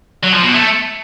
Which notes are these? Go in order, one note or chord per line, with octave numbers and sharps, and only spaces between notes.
F#3
F3
B2
A3